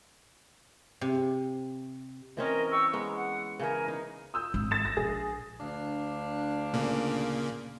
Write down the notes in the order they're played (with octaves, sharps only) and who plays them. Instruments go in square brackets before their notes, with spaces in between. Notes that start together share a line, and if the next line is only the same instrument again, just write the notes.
[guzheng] C3
[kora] E3 C4 C#4 [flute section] A#4 D#5
[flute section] G4 C#6 E6
[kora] G#3 B3 [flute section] A#5
[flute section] F#5
[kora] C#3 E3 G#4 [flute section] A#4 G#5
[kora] D#4
[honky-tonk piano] D#6 E6 G6
[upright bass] G#1 E3
[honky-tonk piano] A6 E7
A#6
[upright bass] A#1 [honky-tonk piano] G#4
[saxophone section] D2 D4 F5
[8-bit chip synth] A#2 C#3 A#3